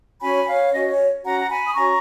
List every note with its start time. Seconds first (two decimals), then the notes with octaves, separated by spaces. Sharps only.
0.21 C#4 F#4 C#5 G#5 B5
0.47 C#5 F5
0.72 C#4 F#4 C#5 D#5
0.89 C#5
1.23 C#4 F#4 C#5 F#5 A#5
1.40 A#5
1.49 G#5 B5
1.67 D#6
1.75 C#4 F#4 C#5 A#5 C#6